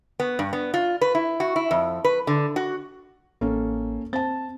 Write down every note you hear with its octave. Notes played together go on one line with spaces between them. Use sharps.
B3
G2
B3
F4
B4
E4
F#4
E4
F2
B4
D3
F#4
A1 A#3 C#4 A4
C4 A5 A6